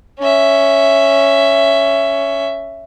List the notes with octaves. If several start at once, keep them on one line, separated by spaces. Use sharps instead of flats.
C#4 E5